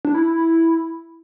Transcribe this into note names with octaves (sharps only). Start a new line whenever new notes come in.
D4
E4